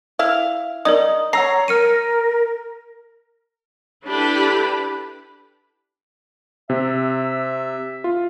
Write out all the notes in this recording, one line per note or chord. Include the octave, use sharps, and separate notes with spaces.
E4 F5
D#4 A#4 D5 D#6
C#5 F#5 A#5 E6 C7
A#4 F6 C#7 D#7
D4 E4 G4 A4 B4 B5
C3 E5
F4